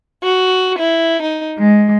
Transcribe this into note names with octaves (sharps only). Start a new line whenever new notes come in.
F#4
E4
D#4
G#3